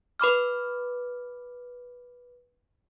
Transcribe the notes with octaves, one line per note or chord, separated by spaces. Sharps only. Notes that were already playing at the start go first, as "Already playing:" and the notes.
B4 B5 D6 F6